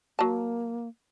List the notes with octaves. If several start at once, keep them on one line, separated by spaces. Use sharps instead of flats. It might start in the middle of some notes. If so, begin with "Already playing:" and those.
F#3 A#3 A5